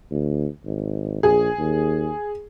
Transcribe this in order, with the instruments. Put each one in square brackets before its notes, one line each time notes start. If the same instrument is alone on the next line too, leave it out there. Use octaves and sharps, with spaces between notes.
[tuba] D2
G#1
[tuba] A#1 [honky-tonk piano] G#4
[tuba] D#2